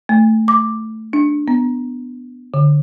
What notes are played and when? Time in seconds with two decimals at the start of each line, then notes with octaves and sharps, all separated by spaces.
0.09 A3
0.48 D6
1.13 D4
1.48 B3
2.54 D3